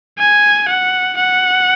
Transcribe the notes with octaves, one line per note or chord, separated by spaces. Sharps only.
G#5
F#5
F#5